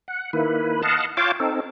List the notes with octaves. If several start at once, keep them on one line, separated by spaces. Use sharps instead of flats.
F#5
D#3 A#3 E4 B4
D#5 F5 F#5 A5
F4 C#5 F5 G5 A5 D6
C4 D#4 A4